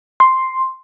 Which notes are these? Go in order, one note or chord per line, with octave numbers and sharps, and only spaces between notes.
C6